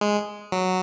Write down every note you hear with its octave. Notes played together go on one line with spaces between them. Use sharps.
G#3
F#3